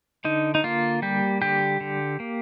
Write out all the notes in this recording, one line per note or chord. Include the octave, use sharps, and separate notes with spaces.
D3 D#4
D#4
A#3 F4
G3 G4
D3 G4
D3
A#3